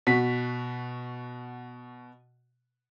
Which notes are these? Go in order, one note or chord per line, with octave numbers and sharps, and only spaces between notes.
B2 F#4 B6